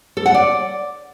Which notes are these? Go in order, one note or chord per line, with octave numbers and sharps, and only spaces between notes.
A4
F#5
D5